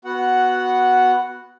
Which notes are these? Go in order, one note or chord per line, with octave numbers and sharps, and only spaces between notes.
B3 F#4 F#5